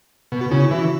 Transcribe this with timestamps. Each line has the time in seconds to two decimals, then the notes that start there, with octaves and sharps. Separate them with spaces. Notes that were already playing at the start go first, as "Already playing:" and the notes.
0.32 B2
0.41 F#4
0.51 C#3 E4
0.60 F#4
0.71 E3